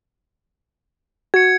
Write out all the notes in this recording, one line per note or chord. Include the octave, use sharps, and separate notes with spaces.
F#4 G#6 C#7